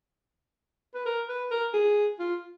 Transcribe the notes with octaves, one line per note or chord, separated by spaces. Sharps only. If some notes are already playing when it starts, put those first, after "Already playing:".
B4
A#4
B4
A#4
G#4
F4